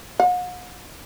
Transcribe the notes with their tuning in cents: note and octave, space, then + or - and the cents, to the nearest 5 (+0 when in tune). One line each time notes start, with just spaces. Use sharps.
F#5 -45